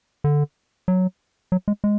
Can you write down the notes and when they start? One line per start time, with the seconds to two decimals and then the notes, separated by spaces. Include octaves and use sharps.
0.24 D3
0.88 F#3
1.52 F#3
1.68 G#3
1.84 G#3